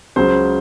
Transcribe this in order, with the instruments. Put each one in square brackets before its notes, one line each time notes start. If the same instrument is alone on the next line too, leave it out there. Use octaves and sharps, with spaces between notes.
[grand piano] C#2 C#3 F#3 C5